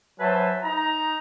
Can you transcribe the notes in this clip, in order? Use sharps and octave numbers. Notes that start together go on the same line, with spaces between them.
F#3 B4 C5 E5 G#5 A5
D#4 A#5